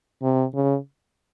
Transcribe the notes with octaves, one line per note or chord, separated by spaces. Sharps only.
C3
C#3